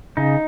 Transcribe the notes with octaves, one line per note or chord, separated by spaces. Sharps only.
C#3 D#4